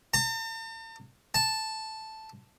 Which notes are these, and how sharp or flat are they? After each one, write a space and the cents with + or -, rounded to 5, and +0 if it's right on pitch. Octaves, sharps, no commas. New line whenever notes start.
A5 +45
A5 +0